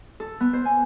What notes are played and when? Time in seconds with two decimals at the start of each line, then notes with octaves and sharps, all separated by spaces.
0.20 A4
0.40 B3
0.53 C5
0.65 G#5